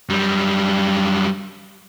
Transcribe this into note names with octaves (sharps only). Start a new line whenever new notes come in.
F#2 G3